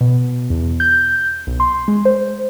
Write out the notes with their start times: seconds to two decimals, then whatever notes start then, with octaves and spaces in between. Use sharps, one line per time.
0.01 B2
0.50 E2
0.80 G6
1.47 B1
1.60 C6
1.88 G#3
2.05 C5